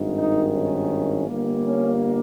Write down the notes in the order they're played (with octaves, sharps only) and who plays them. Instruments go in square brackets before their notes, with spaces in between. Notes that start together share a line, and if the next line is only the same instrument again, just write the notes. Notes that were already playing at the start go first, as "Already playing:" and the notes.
Already playing: [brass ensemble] G#1 G2 D#3
D#4
C#4
G1 G2 G3 A#3
C#4